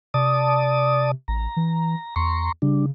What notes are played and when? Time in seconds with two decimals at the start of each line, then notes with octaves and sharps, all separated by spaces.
0.14 C3 D5 A5 D#6
1.28 A1 A#5
1.57 E3
2.16 E2 A#5 C6 C#6
2.62 C#3 G3 D4